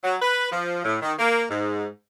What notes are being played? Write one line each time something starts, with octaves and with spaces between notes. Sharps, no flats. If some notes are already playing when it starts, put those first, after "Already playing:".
F#3
B4
F3
A2
D#3
A#3
G#2